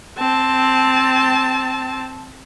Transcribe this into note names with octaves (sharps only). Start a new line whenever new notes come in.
C4 A5